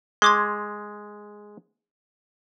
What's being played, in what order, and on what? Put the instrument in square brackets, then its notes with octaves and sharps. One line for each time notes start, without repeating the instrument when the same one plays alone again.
[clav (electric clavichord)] G#3 [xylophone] C6 D6 G#6